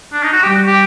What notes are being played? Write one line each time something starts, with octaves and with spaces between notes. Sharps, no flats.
D4
D#4
F#4
G3 G4
F#4
G4